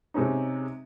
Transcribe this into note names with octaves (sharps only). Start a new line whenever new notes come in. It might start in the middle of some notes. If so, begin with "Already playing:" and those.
C3 G#3 C#4 D#4